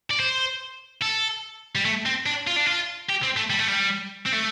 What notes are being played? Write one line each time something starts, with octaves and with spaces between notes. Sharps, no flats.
D5
C5
A4
G3
A3
C4
D4
F4
D4
F4
G4
C4
A3
G3
A3
G3
C4
A3